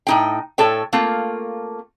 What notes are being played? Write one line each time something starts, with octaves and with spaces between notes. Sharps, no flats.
A2 D#4 G5
A2 A4 C#5 G5
A3 A#3 C4 F4